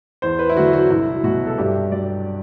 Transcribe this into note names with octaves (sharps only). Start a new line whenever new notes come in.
E2 C5
B4
E4
D3 F#3 F#4
F#4
C2 E4
B2 F#3 F#4
A4
G2 G4
F#3 D5